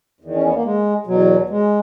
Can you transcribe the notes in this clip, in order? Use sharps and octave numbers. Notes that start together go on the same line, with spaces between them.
E2 D#3
C#4
B3
A#3
G#3
E2 B2 F#3
G#3